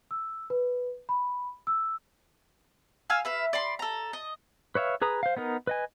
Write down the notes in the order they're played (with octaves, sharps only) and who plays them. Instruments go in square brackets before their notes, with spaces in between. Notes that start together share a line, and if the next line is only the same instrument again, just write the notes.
[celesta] E6
B4
B5
E6
[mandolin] F5 G#5 E6 F6
B4 E5 F5
D5 B5 C6
A4 A#5
D#5
[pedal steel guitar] B4 C#5 E5 F5
G#4 B4 A#5 D#6
C5 F5
B3 D#4 A#4
B4 D#5 G#5